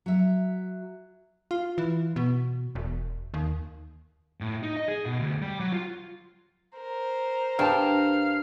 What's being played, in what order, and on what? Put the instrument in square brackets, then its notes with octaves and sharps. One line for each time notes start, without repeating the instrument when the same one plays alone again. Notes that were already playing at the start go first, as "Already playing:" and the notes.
[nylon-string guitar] F#3 E5
[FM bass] F4
E3
B2
E1
D#2
[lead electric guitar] A2
D#4
D#5
G#4
B2
D2
G3
F#3
F4
[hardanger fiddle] A#4 C5
[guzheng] G2 [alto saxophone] F5 [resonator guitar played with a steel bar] G5 A5